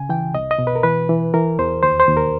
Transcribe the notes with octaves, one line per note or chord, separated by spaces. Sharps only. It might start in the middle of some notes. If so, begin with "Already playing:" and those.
Already playing: C#3 G#5
E3 G5
C2 D#5
D#5
B2
B4
A#4
E3 B4
E3
E3 A#4
E2 C5
D#2 C5
C5
D#2
A#4